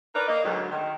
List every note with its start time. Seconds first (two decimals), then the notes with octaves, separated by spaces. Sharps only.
0.15 D#4 A#4 B4 D5
0.28 A#3 D#5
0.44 D2 G#2 F#3
0.70 D#3